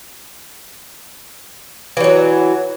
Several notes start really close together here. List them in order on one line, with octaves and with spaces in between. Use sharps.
E3 G3 F#3